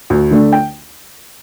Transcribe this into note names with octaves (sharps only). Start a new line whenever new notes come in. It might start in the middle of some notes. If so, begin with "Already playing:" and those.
D2
D3 A3 D4
G5